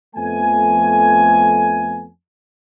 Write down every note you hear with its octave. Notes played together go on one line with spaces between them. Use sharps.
F2 F3 A3 B3 G#5